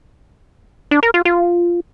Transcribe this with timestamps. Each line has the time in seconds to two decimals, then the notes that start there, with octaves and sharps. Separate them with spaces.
0.91 D4
1.03 A#4
1.14 F4
1.25 F4